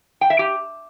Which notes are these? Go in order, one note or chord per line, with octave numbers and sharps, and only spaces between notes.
G5
E5
G4